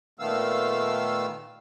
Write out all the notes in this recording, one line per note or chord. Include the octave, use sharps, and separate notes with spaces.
A#2 D#3 A3 B3 F5 E6